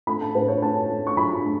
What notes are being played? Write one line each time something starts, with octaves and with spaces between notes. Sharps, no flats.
A3 B5
A5
A2 B4
C#5
A3 A5
A3
C#6
F#3 B5
A3